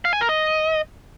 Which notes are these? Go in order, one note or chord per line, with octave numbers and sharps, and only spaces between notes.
F5
G#5
A#4
D#5